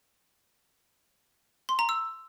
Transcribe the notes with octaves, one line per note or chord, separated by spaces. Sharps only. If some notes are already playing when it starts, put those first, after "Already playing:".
C6
A#5
E6